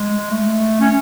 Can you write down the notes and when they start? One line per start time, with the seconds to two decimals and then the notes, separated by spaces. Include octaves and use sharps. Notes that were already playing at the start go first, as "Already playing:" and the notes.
Already playing: G#3
0.31 A3
0.80 C#4